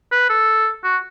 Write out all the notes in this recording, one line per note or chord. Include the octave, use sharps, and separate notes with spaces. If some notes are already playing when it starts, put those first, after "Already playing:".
B4
A4
F#4